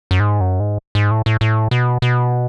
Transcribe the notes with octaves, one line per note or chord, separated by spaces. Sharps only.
F#2
G#2
F#2
G#2
G#2
A2
A2
A2
B2
B2